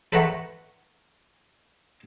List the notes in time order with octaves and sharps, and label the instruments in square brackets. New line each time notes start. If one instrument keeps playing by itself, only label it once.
[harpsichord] A4 B4 E5 F#5 A#5 C#6